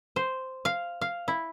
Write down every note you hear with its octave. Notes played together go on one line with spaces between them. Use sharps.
C5
F5
F5
E4